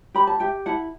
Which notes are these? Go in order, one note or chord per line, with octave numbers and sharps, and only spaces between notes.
G4 B5
A5
G4 E5 G5
E4 F#5 A5